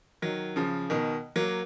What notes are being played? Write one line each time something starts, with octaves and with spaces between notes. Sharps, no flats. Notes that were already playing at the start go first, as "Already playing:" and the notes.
D#3 F#3
C#3 F3
B2 D#3
F#3 A#3